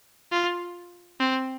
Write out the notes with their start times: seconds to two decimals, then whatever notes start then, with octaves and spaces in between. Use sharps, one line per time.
0.31 F4
1.20 C4